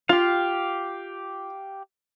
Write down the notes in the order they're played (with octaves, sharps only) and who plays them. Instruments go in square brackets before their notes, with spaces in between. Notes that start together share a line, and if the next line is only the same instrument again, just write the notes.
[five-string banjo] F4 [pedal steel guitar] G4 F5